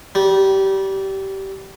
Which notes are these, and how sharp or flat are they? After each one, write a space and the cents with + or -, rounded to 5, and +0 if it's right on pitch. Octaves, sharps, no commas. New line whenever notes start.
G3 -20